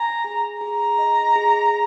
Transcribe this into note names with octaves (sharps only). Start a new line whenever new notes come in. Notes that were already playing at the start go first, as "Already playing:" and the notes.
Already playing: G#5 A#5
G#4
G#4 A#5
D#5
G#4